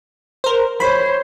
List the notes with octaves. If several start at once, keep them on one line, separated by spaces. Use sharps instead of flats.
A#4 C5
C5 C#5 B5